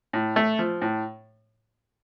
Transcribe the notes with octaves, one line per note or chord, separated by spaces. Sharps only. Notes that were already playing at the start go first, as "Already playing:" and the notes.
A2
A3
F3
A2